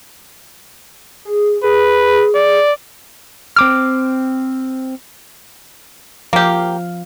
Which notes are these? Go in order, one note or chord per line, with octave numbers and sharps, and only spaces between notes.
G#4
G#4 B4
D5
C4 D6 F6
F3 A#3 G4 F5